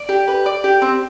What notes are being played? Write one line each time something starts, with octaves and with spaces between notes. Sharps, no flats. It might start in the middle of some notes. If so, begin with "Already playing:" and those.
Already playing: D5
G4
B4
D5
G4
C4